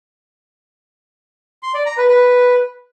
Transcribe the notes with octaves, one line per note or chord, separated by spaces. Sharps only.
C6
D5
A#5
B4
B4